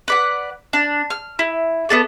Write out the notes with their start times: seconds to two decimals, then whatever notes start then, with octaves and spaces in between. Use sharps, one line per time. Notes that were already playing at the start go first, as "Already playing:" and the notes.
0.08 B4 D5 F#5
0.73 D4
1.10 F6
1.39 E4
1.89 B3 D4 A4 D5